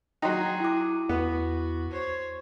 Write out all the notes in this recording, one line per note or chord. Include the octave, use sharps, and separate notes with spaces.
F#3 D#4 F#4 G#4 G5 C6
E4 D6
E2 B3 F#4
C5 C#5